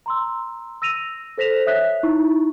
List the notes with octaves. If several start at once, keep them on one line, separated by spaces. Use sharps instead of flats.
A#5 C6 E6
E6 A#6 D#7 F7
A4 C5 A#6 B6 E7 F7
C#5 E5 D#6 F#6 B6
D#4 E4 C#6